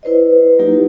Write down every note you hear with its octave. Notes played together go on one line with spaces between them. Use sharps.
E4 B4 C5 D5 D#5
F#3 A#3 D#4 E4 G4